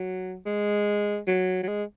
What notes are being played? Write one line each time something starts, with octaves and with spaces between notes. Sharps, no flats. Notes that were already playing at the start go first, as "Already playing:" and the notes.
Already playing: F#3
G#3
F#3
F#3
G#3